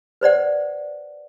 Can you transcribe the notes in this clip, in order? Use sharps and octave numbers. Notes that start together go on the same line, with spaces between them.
B4 C5 D5 F#5